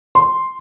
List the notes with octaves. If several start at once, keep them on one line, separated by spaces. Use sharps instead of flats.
C6